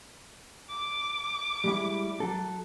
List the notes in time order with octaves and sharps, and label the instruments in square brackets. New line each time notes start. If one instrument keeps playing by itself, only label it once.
[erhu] D6
[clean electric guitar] G3 G#3 E4
F#3 A4